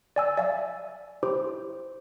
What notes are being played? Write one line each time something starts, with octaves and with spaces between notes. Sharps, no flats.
D5 G#5 E6
D5 E5 F5 G#5
E4 G4 C5 D6